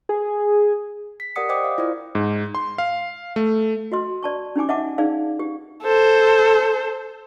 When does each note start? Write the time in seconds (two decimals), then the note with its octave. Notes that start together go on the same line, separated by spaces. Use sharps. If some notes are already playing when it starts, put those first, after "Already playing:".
0.09 G#4
1.20 B6
1.36 G4 A#4 D5 F#5 D#6 C#7
1.49 C5 D5 D#5 G5 D6 D#6
1.64 F5
1.78 E4 F4 C5 D5
2.15 G#2
2.55 C6
2.78 F5
3.36 A3
3.92 F#4 D#5 C6
4.23 D5 A5 C#6
4.56 C#4 D#4 G4 G#5 D6
4.69 D#5 E5 F#5 A5 D6
4.98 D#4 G#4 D5 F5
5.40 G4
5.83 A4 C5